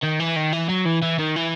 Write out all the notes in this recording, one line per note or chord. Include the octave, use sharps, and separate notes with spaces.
D#3
E3
D#3
E3
F#3
E3
E3
D#3
E3